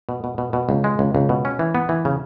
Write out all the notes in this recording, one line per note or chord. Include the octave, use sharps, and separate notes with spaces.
B2
B2
B2
B2
C#2
G#3
C#2
C#2
B2
C#4
E3
B3
E3
C#3